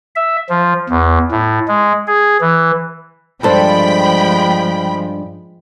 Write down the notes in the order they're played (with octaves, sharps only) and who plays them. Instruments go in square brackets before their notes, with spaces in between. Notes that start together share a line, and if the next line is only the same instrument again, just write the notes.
[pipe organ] E5
F3
E2
A2
G#3
G#4
E3
[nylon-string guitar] G2 A4 C5 [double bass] F3 G#3 [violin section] G5 B5